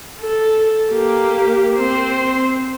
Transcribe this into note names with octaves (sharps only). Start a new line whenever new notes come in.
A4
A#3 G4
C4 C5